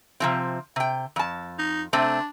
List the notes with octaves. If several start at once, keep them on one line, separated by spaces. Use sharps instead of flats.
C3 F3 C4
C3 G5
F2 A5
D#4
C3 A3 C4 D4